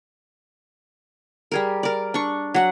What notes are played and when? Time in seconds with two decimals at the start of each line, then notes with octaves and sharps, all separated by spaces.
1.52 G3 G#4 A#4
1.83 A#4 D5
2.14 D4 C#6
2.54 F#3 F#5